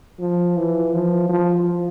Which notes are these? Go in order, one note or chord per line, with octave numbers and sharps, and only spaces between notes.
F3
E3
F3
F3